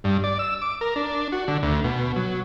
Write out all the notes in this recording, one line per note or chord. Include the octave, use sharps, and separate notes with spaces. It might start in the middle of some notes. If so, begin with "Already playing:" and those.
G2
D5
E6
D6
A#4
D4
F#4
D3
D2
B2
F#3